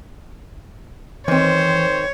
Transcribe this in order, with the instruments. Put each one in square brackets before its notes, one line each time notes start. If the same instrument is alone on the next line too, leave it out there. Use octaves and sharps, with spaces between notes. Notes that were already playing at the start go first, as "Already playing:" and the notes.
[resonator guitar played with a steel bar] D#3 C4 [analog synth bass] E3 [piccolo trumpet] C5 [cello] C#5